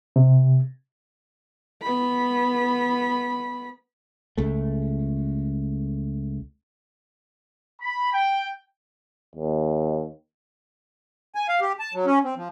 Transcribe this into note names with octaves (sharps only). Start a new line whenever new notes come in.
C3
B3 B5
C#2 A3
B5
G5
D#2
G#5
F5
G4
A5
F#3
C#4
C4
F3